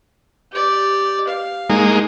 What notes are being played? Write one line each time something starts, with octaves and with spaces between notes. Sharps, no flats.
G4 D5
F5
G#3 A#3 D#4